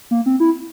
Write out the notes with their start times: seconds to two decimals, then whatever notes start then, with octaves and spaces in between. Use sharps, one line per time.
0.11 A#3
0.26 C4
0.40 E4